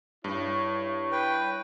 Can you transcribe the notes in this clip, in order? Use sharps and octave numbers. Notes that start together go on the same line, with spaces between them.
G2 E4 C#5
B4 G5